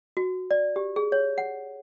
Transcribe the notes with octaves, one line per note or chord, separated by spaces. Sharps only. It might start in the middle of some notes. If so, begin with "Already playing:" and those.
F#4
D5
G4
G#4
C#5
F#5